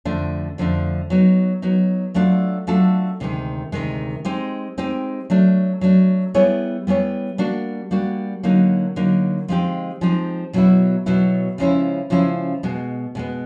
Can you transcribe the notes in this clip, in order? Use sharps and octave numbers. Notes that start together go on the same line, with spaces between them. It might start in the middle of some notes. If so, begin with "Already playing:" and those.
F2 D3 F3 A3 D4
F2 D3 F3 A3 D4
F#3 B3 D#4
F#3 B3 D#4
F#3 A3 D4 F4 A4
F#3 A3 D4 F4 A4
D2 C3 D#3 G#3
D2 C3 D#3 G#3
G#3 C4 D#4 G4
G#3 C4 D#4 G4
F#3 A3 D4
F#3 A3 D4
G3 B3 E4 G#4 C#5
G3 B3 E4 G#4 C#5
G3 A#3 D4 F#4
G3 A#3 D4 F#4
D3 F#3 A#3 D#4
D3 F#3 A#3 D#4
F3 G#3 C4 D#4 G4
F3 G#3 C4 D#4 G4
B2 F#3 B3 E4
B2 F#3 B3 E4
C#3 F3 G#3 C#4 E4
C#3 F3 G#3 C#4 E4
B2 G#3 B3
B2 G#3 B3